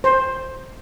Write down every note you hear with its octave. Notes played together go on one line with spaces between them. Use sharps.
C5